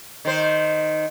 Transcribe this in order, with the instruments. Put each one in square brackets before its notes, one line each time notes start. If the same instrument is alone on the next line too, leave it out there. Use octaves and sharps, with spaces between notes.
[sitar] D#3 C5